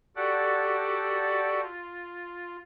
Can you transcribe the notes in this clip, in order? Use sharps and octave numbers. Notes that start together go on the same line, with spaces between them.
F#4 G4 A4 D5 F#5
F4